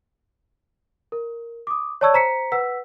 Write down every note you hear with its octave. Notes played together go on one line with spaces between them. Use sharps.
A#4
D6 D#6
C#5 D5 A5 C#6 E6 G#6
C5 A#5 B6 C#7
B4 F#5 E6 B6